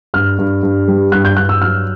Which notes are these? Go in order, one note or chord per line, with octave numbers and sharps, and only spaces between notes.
G2 F6
G2
G2
G3
G2 F#6
G6
G2 F#6
E6
F#3 F6